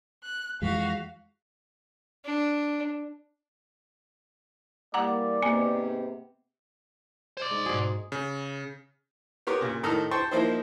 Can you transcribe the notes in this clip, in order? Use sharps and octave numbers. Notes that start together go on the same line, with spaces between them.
F#6
F2 E3 F3 G#3 F#4 F5 B6
D4
E3 G3 A#3 D5 F#5 A#5 D6
G#2 C3 A#3 B3 G#5
C5 D5 G#6
G#3 D#4
G#2 B2 F#4 G#4
C#3
B3 G4 A#4 C#5
A#2 C#3
A2 D#3 A4 A#5 D#6 F6
C5 G5 A5 C6 C#6
F3 A#3 D#4 E4 C5